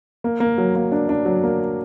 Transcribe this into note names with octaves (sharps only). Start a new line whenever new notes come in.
A#3
A#3
F#3
A#3
D4
D4
F#3
A#3